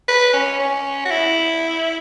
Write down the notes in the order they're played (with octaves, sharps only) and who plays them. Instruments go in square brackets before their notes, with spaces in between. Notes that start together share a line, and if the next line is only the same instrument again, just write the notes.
[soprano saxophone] B4
C#4
C#4
F#4
E4